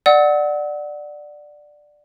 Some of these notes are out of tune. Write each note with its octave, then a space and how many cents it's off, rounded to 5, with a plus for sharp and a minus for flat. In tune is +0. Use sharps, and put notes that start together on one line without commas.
D5 +10 F#5 +0 E6 -40